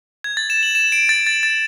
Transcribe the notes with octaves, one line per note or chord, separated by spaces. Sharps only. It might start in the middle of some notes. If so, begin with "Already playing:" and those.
G#6
A6
E7
F#7
E7
D7
A6
A6
A6